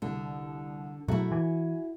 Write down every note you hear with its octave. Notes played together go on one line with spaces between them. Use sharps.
C2 D3
B2 F#3 A3 E4 F#4 E5 A#5
E3 G#5